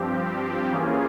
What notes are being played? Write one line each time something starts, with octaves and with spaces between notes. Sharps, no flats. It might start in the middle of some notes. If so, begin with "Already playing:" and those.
Already playing: G2 F3 C4 G4
E3 A#3 C#4 F4 G#4